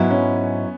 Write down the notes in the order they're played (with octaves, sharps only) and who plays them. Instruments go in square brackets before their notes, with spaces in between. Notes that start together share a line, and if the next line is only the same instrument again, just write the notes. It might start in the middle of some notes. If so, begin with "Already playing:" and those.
Already playing: [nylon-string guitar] G#2 F#3 E4 [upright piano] B3
[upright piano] C#4